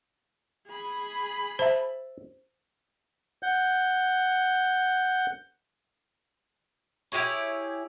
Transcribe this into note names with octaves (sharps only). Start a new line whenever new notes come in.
G#4 B5
C5 E5 A5
F#5 G6
E4 G4 G#4 C#5